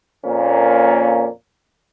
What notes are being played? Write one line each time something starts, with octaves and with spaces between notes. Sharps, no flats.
F2 A#2 A#3 C#4